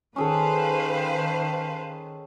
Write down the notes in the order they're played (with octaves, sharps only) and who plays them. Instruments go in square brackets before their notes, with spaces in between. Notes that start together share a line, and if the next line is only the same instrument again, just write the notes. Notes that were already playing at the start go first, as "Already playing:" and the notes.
[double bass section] D#3 [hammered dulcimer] C#4 G#4 A4 [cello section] B4 C5 F5